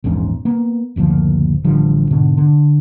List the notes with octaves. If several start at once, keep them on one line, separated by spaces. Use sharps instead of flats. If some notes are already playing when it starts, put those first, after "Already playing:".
A#1 E2 G#2 C#4
A#3 B3
F#1 D2 A#2 F3
A1 D3 F3 G3
G#2 B2 D3
D3